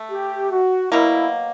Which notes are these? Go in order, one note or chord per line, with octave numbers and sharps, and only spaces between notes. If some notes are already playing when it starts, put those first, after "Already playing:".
Already playing: A3
G4
F#4
B2 F#3 A#3 E4